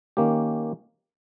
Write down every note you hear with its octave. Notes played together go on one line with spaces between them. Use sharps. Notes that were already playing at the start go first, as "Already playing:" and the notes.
D#3 A#3 C#4 G4